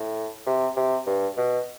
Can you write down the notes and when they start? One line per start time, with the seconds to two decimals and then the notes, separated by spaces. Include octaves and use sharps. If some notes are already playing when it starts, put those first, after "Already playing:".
Already playing: A2
0.47 C3
0.77 C3
1.06 G2
1.38 B2